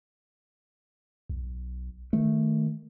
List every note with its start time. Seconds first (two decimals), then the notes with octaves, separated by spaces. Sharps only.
1.29 B1
2.13 D#3 A3